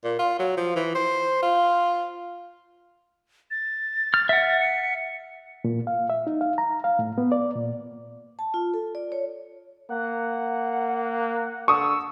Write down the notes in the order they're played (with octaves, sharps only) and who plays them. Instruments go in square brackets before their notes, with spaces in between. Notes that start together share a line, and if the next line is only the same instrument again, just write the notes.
[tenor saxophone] A#2
F4
F#3
F3
E3
C5
F4
[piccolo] A6
[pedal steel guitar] F6
E5 F#5
[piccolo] C#7
[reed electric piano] A#2
F5
E5
D#4
F5
A#5
F5
A2
B3
D5
A#2
[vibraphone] A5
F4
A4
D5
C#5
[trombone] A#3 [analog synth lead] F#5
[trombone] D3 [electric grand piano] C#6 D#6 [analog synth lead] E6